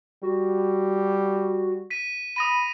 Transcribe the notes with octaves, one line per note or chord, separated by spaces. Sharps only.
G3 F#4
B6 D#7
B5 D#6 A#6 D#7